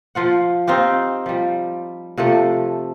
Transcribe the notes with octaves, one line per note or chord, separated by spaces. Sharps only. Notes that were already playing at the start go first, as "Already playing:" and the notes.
F3 F4 F#5
C4 D#4 F4 G4
F3 G3
C3 F3 A3 A4